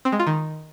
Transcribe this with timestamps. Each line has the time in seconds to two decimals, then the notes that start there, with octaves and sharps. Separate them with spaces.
0.05 C4
0.12 G#3
0.19 F4
0.27 D#3